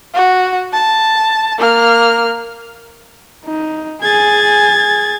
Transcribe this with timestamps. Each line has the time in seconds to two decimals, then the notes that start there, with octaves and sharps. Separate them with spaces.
0.15 F#4
0.73 A5
1.58 A#3 F6
3.45 D#4
4.02 G#4 G#5 G#6 A6
4.72 G#4